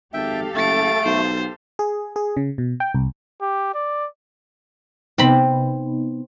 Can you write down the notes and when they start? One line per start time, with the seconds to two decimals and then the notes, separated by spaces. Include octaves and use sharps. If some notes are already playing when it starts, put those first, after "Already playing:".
0.14 G#1 G4 A4 E5 F5 G5
0.55 F#1 A3 A6 D7
1.05 B1 C5
1.79 G#4
2.16 G#4
2.37 C#3
2.58 B2
2.80 G5
2.95 C2
3.41 G4
3.75 D5
5.18 C3 B3 C4 D#4 B5